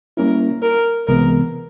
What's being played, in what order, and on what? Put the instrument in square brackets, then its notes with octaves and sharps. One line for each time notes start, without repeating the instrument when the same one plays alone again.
[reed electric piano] G3 A#3 C#4 E4 [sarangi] A#4
[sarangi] A#4
[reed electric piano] C2 C3 E3 G#3 B3 [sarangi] A#4